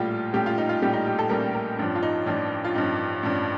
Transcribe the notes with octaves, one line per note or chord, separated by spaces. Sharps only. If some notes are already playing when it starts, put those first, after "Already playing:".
Already playing: A#1 A2 G3 F4
A#1 A2 G3 G4
F4
D#4
F4
A#1 A2 G3 G4
D#4
G4
A4
A#1 A2 G3 A#4
A#4
A1 G2 F3 D4
F4
D#4
A1 G2 F3 D4
F4
A1 G2 F3 D#4
A1 G2 F3 D4